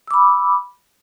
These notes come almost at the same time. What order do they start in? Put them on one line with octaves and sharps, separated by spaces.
E6 D6 B5